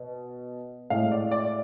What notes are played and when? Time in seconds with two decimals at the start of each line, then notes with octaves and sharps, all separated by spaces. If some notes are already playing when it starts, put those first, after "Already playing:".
Already playing: B2
0.90 A2 G#3 F5
1.12 D5
1.31 D5